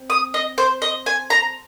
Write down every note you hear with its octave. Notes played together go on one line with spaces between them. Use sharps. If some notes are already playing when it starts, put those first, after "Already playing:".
Already playing: C4
D#6
D#5
C5
D#5
G#5
A#5